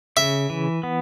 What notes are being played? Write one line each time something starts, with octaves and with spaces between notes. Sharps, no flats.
C#3 E5
E3
B3